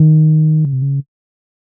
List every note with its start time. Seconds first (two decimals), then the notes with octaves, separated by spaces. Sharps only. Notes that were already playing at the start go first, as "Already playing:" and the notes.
Already playing: D#3
0.65 C#3
0.73 C3
0.82 C#3